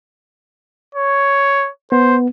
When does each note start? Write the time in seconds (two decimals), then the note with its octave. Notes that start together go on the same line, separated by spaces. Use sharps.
0.95 C#5
1.92 B3 C5